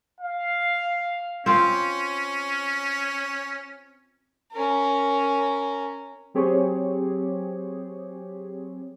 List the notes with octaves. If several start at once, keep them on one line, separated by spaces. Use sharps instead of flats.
F5
C4 C#4 F4
C#4 A#4
F#3 C4 G4 G#4 C#5